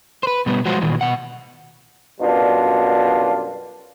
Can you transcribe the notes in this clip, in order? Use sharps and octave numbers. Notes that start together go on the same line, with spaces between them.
B4 C5
B2 G3 B3
F3 F#3 G#3 F4 F#4 C5
A#2 D#3 E3
B2 F#5
F#2 B2 G3 D4 F4